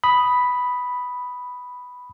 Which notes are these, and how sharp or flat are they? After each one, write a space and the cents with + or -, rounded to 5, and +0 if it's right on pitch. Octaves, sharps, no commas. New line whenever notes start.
B5 +0 D#6 +0